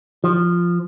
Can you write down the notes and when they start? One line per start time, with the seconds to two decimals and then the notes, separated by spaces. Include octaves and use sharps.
0.24 F3